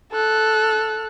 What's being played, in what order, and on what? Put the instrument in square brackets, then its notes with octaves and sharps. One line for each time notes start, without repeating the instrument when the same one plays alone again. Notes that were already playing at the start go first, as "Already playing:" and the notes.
[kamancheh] A4 F#6